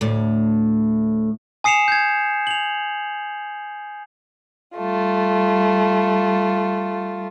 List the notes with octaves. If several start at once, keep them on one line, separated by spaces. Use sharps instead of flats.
D2 A2
G#5 D#6 C7 C#7 E7 F7
G6 G#6
F7 F#7
G3 A3 F4